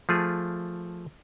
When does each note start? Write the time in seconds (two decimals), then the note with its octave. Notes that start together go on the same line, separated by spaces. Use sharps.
0.09 F3 A3 F4 G#4